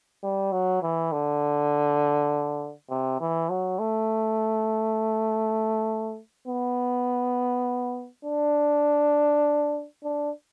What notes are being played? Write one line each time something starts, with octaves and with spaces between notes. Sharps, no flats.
G3
F#3
E3
D3
C3
E3
F#3
A3
B3
D4
D4